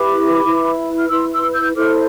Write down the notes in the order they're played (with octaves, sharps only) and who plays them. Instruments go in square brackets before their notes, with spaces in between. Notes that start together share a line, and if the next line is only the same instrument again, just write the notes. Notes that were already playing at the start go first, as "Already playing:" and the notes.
Already playing: [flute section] E4 G4 B4 B5 D6
E4 B4
F6
E4 B4 C6 E6
C6 E6
E6 G6
E4 A4 C5 D6 F6